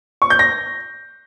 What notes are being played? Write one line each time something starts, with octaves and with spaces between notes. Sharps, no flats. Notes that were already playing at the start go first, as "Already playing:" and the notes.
C#6
G6
A#6